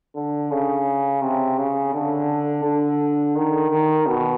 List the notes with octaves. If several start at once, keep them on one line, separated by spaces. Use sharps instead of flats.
D3
C#3
C3
C#3
D3
D3
D#3
D#3
B2